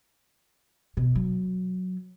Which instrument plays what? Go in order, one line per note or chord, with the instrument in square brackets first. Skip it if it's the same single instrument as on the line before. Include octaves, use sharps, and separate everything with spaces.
[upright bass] B2
F#3